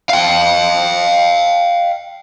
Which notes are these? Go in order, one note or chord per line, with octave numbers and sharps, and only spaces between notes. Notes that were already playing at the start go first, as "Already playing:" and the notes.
F5 G5